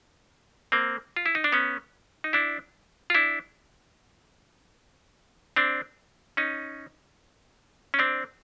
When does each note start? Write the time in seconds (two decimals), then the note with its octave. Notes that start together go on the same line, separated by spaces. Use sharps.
0.72 A#3 C4
1.16 F4
1.26 E4
1.35 D#4
1.44 D4
1.52 B3 C#4
2.24 D#4
2.33 D4 E4
3.10 F4
3.14 D4 E4
5.56 C4 D4
6.37 C#4 D#4
7.94 C#4
7.99 C4 D4